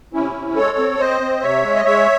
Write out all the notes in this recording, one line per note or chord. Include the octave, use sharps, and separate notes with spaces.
C3 C#4 E4
C3
G#3 A4 C#5
C4
C4 C5 D#5
C4
C3 C#5 E5
G#3
D#5
G#3 C#5 E5